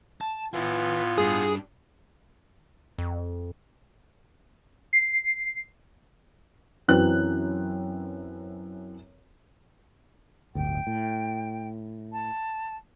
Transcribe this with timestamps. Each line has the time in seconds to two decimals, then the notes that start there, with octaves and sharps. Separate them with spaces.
0.21 A5
0.54 A2 B3 F4 B4 G#5
1.18 G2 D4 G#4
2.98 F2
4.93 C7
6.88 F#2 E3 C4 B4 F#6
10.55 D1 G1 D2 G5
10.87 A2
12.12 A5